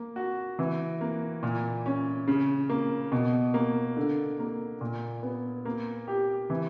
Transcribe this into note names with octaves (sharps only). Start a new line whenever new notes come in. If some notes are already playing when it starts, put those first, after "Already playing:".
Already playing: A#3
F#4
E3
A#3
A#2
C#4
C#3
A#3
B2
A#3
D3
A#3
A#2
B3
A#3
G4
E3